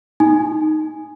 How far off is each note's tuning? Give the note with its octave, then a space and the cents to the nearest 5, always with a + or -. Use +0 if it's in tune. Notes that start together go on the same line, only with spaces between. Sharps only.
D#4 +0 G#5 +0